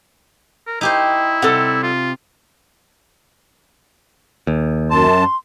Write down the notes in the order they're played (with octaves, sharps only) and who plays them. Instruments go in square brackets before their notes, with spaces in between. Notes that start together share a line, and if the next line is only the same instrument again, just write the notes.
[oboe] A#4
[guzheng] D#4 G4 C5 [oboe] E4
[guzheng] C3 [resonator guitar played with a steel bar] G3 A4 F#5
[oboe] F4
[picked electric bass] D#2
[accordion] F#2 A5 [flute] C6